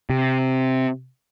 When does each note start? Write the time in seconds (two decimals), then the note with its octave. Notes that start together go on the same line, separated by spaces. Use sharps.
0.10 C3